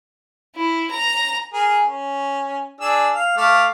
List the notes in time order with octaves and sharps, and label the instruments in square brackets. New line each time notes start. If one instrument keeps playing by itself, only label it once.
[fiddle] E4
A#5
[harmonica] G#4 A#4
C#4
D4 G#4 E6
F5
A3 F5 D6